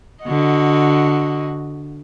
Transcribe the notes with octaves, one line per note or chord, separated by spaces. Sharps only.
D3 F#4 D#5